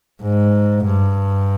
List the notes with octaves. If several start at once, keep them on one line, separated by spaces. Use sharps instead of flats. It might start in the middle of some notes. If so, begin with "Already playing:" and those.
G#2
G2